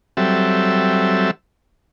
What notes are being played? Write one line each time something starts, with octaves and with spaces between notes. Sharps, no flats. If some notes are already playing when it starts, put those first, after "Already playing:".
F#3 G3 C4 A4 E5